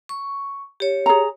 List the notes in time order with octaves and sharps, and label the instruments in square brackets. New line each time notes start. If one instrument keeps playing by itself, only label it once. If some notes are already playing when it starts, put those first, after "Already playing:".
[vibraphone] C#6
G4 C#5
[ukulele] G#4 A#5